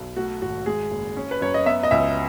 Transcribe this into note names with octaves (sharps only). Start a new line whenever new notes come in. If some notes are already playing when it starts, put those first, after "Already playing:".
Already playing: B1
A3 F#4
G#1 F#4
G#3 G#4
F#1
C#4
B4
F#2 C#5
D#5
B3 E5
D#5
C#2 E5